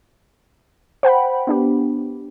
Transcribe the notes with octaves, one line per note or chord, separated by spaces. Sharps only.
C5 F#5 G5 B5
B3 D4 G4